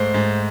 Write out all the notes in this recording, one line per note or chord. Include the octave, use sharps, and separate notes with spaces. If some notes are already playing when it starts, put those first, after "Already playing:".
Already playing: G#2 A3 C5
G#2